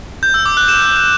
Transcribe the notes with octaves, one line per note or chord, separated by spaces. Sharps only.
G6
E6
D6
F#6
E7